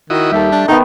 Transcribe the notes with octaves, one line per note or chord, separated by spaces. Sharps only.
D#3 E4 F#4 D#5
D#2 G3 A4 E5
D4
D#3 B3 D#4